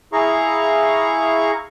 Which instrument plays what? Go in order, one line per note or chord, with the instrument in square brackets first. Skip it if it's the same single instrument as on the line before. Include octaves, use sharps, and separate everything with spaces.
[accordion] E4 G#4 F5 A#5 C#6